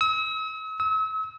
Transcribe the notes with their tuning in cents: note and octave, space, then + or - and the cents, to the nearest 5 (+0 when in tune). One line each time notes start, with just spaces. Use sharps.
E6 -45
E6 -40